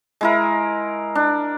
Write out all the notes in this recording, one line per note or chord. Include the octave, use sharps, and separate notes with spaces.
G#3 E4 A#4
D4